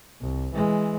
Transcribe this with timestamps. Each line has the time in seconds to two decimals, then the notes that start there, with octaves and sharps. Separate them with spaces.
0.21 C2
0.55 E3 G#3